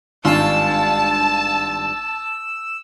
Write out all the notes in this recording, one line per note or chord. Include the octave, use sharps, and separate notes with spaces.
G#1 G2 F4 G#5 A5 E6